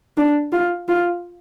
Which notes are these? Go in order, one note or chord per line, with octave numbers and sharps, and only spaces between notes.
D4
F4
F4